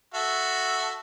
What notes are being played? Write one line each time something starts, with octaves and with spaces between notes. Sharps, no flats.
F#4 A4 E5